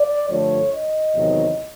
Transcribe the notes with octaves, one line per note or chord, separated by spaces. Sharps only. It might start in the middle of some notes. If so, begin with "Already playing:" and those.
Already playing: D5
G2 D3 F3 A3 C#5
D#5
E2 C3 D#3 F#3